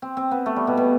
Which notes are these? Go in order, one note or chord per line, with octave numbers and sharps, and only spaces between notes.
C4
C4
B3
A3
G3
B2
B2